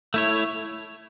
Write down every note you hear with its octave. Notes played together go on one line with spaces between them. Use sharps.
A3 E4 C#5